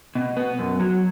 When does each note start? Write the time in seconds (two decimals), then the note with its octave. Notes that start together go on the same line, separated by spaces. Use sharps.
0.15 B2
0.37 B3
0.59 F#2
0.80 F#3